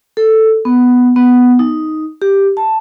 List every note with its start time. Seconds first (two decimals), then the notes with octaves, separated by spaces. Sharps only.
0.17 A4
0.65 B3
1.16 B3
1.59 D#4
2.22 G4
2.57 A5